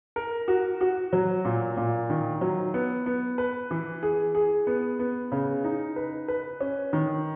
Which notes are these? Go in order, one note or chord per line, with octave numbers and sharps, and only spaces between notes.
A#4
F#4
F#4
F#3
A#2
A#2
D#3
F#3
B3
B3
B4
E3
G#4
G#4
B3
B3
C#3
D#4
B4
B4
C#4
D#3